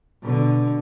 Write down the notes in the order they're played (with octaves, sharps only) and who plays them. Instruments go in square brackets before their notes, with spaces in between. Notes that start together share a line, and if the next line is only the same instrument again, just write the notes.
[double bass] B2 D3